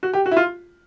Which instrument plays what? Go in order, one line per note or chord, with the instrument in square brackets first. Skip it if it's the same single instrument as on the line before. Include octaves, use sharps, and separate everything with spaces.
[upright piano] F#4
G4
F#4
E4
F4